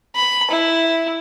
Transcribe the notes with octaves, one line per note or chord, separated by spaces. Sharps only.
B5
E4